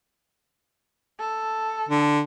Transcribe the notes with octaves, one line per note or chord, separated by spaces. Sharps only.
A4
D3